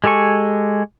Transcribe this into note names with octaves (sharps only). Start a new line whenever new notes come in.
G#3 G4 A4 G#5 C#6